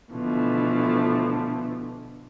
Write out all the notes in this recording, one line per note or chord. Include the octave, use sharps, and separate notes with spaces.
B2 D3 E3 F3 A3